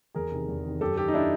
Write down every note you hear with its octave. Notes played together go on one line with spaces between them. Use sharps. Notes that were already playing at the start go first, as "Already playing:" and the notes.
E2 G#4 A#4
C3 D#3
E2
C3 D#3
F#2 G4 A4
D#3 G4 A4
D#4
D4 E4